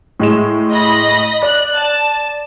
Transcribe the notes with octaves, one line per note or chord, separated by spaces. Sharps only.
A2 G#3 E7
D#5 B5 A#6
D5 F#6
A5